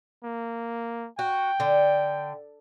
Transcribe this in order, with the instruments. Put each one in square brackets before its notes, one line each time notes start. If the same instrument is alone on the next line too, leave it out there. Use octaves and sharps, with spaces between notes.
[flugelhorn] A#3
[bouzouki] F#4 [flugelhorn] G5
[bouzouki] D3